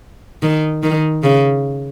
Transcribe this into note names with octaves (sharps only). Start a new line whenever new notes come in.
D#3
D#3
C#3